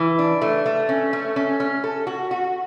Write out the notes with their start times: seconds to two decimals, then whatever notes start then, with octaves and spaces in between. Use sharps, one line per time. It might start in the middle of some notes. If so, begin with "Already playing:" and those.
Already playing: E3
0.19 D4
0.42 A3
0.66 A3
0.89 C#4
1.13 A3
1.36 C#4
1.60 C#4
1.84 A4
2.07 F#4
2.31 F#4